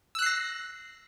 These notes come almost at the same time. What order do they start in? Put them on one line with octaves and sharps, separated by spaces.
E6 F#6 C7 A#6